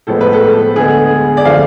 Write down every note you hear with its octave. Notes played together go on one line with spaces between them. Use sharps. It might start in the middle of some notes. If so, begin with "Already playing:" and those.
A2 F3 G#3 B3 A4
B4
A4
D2 D3 G#3 B3 G#4
D5
D3 F3 A3 F5